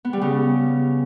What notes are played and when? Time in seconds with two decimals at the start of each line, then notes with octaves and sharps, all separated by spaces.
0.05 B3
0.13 G3
0.22 C#3